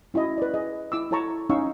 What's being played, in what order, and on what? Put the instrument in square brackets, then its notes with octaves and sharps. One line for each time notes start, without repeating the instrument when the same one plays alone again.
[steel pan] C#4 E4 F#4 D#5
B4 D5
G#4 D#5
E4 D6 E6
E4 A4 C#5 A5 A#5 C#6
C#4 D#4 F5 C#6 E6